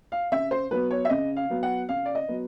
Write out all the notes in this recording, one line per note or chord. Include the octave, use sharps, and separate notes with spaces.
F5
C#3 E5
C5
F#3 B3 B4
C#5
E5
C#3 D#5
F5
F#3 B3
F#5
C#3 F5
D5
D#5
F#3 B3